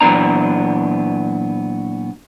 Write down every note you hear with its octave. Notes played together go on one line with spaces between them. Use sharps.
A#2 E3 F#3 B3 D4 A#5